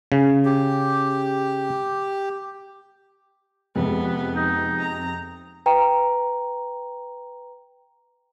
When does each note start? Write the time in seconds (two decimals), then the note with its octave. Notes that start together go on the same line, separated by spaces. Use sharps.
0.12 C#3
0.45 G4
3.76 F2 C3 G#3 B3
4.36 D#4
4.80 A#5
5.66 B4 G5 A#5